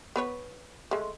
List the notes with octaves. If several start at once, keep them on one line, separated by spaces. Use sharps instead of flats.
B3 B4 C#5
G#3 A3